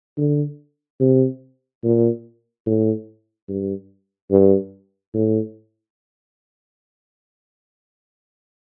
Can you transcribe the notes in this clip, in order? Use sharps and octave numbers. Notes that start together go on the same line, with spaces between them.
D3
C3
A#2
A2
G2
G2
A2